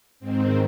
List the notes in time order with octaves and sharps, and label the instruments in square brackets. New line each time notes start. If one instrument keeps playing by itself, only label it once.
[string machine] G#2 D#3 C4